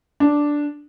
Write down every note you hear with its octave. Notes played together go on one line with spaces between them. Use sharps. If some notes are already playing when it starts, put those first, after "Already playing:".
D4